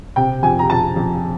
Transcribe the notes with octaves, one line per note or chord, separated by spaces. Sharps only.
C3 G5
F2 G#5
A#5
F2 A5
F2